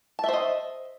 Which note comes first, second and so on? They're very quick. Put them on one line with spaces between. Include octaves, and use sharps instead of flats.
A5 E5 C5 D#5